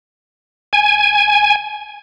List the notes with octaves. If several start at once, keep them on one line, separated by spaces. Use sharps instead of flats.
G#5